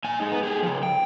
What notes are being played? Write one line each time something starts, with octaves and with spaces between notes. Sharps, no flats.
A#2 G#5
G#3 D#4
B3
G4 G#4
C#3 F3
G5